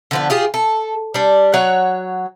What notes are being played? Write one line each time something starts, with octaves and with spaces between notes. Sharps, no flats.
D3 F3 B3
F4 G4 G#4
A4
G3 D4
F#3 C#5 F#5